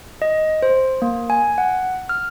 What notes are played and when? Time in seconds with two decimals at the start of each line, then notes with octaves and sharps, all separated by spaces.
0.22 D#5
0.62 C5
1.02 A#3
1.30 G#5
1.58 F#5
2.09 F6